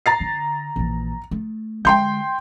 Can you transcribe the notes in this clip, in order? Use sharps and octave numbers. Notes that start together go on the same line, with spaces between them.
A#5 A6 C7
D3
A#1 E3
A3
D3 G#3 G5 C6 G6